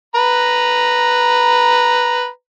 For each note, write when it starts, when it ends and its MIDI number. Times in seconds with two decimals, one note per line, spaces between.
0.15 2.28 71
0.15 2.28 82